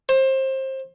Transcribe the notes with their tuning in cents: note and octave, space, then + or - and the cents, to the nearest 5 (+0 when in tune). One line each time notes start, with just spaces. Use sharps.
C5 +25